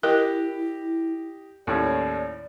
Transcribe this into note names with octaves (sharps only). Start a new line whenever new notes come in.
E4 G4 A#4 D#5
D#2 A2 C#4 D5